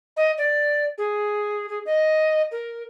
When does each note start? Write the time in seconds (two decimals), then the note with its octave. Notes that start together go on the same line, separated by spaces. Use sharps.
0.17 D#5
0.38 D5
0.98 G#4
1.69 G#4
1.86 D#5
2.51 A#4